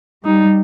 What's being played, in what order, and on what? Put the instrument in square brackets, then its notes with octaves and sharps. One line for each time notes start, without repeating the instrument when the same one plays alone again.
[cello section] G3 [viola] D#4